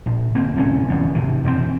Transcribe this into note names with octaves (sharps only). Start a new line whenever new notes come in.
A#1
G1 A#3 C4
D1 C2 C#4
G1 E2 G#2
G#1 C3 D#3
E1 F#2 A2 C4